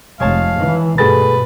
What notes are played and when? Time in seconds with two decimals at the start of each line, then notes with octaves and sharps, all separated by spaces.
0.20 F1 G#3 C#5 F5 A5
0.59 E3
0.98 G2 B2 A3 G#4 B4 A6